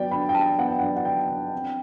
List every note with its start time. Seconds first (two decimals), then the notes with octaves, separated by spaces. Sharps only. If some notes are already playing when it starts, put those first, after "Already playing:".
Already playing: F#3 B3 D5 G5
0.11 D3 B5
0.29 G5
0.35 D3 A5
0.58 B3 F#5
0.68 G5
0.79 F#3 F#5
0.97 F#5
1.05 D3 G5
1.29 D3
1.52 C4